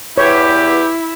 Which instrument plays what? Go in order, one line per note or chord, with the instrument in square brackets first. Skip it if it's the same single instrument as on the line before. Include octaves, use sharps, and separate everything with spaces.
[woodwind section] E2 G4 [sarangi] E4 [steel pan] C#5